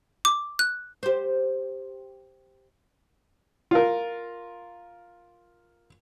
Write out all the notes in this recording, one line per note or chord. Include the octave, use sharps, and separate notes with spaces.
D6
F#6
G4 C5
F4 A#4